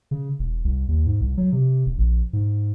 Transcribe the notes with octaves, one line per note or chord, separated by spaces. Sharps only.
C#3
E1
C2
D#2
G#2
C2
F#3
C3
E1
A#1
G#2